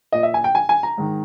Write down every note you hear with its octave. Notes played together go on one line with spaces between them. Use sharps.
A#2 D#5
E5
G#5
G5
G#5
G#5
A#5
G#2 D#3